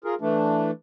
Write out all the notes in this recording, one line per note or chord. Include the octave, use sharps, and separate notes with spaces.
F4 G#4 A#4
E3 A3 D4